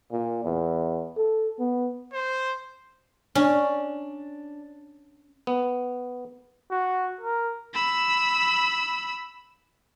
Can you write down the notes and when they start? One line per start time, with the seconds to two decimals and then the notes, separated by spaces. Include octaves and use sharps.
0.12 A#2
0.44 E2
1.17 A4
1.59 B3
2.13 C5
3.35 C#4 D4
5.47 B3
6.71 F#4
7.21 A#4
7.74 B5 E6